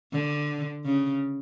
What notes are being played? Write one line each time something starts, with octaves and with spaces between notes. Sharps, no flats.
D3
C#3